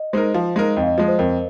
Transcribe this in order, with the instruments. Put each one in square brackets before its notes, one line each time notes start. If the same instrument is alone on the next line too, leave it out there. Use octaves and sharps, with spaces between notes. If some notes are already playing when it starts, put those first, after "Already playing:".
Already playing: [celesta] D#5
[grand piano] G#3 D#4 A#4 [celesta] C5
[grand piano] F3 [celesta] F5
[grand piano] G#3 D#4 A#4
[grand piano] F2 [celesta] D#5
[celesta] F5
D#5
[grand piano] F3 G#3 [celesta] D#5
[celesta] C5
[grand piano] F2 [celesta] A#4